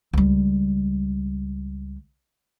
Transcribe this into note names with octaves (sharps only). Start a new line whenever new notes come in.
C#2 G3